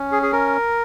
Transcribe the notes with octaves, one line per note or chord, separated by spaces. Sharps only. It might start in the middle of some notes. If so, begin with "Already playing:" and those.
Already playing: C#4
G#4
G#4
A#4